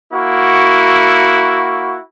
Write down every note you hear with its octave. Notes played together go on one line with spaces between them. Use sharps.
A#3 E4 F#4